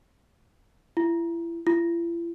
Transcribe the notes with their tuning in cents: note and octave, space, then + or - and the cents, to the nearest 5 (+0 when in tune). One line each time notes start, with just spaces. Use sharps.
E4 +30
E4 +45